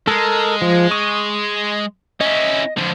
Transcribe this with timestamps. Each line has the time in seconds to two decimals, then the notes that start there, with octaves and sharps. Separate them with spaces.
0.07 G#3 A4 A#4
0.62 F3
0.91 C#6 D#6
2.21 C#4 E4 D#5
2.78 F2 D3